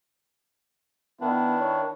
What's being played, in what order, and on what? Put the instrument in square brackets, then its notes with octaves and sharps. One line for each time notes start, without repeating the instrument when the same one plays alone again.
[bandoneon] D#3 D4 [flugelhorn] B3 [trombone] E4
[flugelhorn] C#5